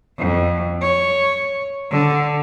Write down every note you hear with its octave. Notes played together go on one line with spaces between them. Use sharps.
F2
C#5
D3